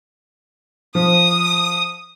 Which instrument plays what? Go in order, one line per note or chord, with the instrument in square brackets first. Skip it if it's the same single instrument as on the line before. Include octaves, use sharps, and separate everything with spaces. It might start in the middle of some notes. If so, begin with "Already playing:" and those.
[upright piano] F3 [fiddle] D#6